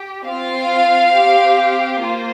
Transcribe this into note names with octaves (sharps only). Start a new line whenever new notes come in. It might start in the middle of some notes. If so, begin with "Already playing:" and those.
Already playing: G4
C4 F4 F5
C4 G4
A#3 F4 C5